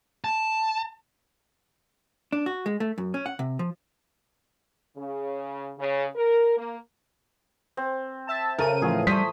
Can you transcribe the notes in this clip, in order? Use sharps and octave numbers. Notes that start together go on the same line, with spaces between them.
A5
D4
F#4
G#3
A3
F#2
C#4
F#5
C3
F3
C#3
C#3
A#4
A#3
C4
E5 A5
C#3 A4 A#4 D#7
A2 E3 F3 G#4
G3 A3 C5 D#6 B6